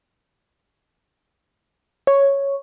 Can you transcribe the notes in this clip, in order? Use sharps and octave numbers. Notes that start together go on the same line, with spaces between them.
C#5